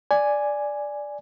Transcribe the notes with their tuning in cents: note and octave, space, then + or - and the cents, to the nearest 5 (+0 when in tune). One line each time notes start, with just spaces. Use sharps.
D5 +0 G#5 +0